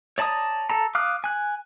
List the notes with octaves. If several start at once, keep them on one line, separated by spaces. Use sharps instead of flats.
C#5 D5 A5 A#5 D#6
A4 A5 A#5
F5 D6 D#6 F6 F#6
G#5 F#6